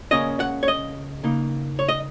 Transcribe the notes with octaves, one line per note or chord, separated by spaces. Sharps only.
C#2 C#3 A#3 C#4 D#5
F#5
C#5
D#5
C#3 A#3 D#4
C#5
D#5